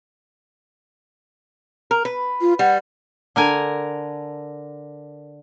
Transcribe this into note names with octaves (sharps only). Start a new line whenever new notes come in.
A#4
B4
F4
G3 F#5
D3 A#4 G#5